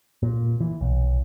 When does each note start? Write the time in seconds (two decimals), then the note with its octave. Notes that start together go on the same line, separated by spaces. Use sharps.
0.23 A#2
0.61 E3
0.81 B1